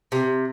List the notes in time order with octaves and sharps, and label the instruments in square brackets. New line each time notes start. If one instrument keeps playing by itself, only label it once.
[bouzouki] C3